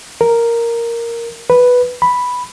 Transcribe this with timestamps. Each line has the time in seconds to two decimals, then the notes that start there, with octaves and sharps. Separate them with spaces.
0.21 A#4
1.50 B4
2.02 B5